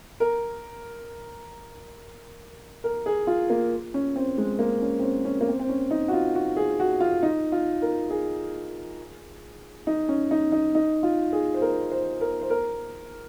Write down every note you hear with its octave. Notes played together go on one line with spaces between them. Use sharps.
A#4
A#4
G#4
F4
A#3
C#4
C4
G#3
A#3
C#4
C4
C#4
C#4
A#3
C4
C4
C#4
D#4
F#4
F4
F#4
G#4
F#4
F4
D#4
F4
A#4
G#4
D#4
C#4
D#4
D#4
D#4
F4
G#4
C5
A#4
C5
A#4
C5
A#4